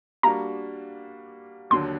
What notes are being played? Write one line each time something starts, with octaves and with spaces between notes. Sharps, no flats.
G3 A#3 D4 F#4 A#5
D#2 D3 F#3 C6